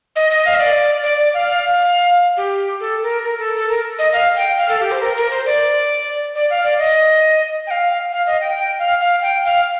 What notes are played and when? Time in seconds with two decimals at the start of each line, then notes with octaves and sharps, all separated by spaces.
0.16 D#5
0.31 D#5
0.45 F5
0.55 D#5
0.60 D5
1.03 D5
1.18 D5
1.34 F5
1.48 F5
2.37 G4
2.80 A4
3.03 A#4
3.24 A#4
3.39 A4
3.55 A4
3.69 A#4
3.99 D#5
4.13 F5
4.36 G5
4.58 F5
4.69 A4
4.80 G4
4.91 C5
5.02 A#4
5.16 A#4
5.31 C5
5.46 D5
6.35 D5
6.50 F5
6.64 D5
6.79 D#5
7.67 G5
7.71 F5
8.12 F5
8.26 D#5
8.41 G5
8.55 G5
8.79 F5
9.00 F5
9.22 G5
9.45 F5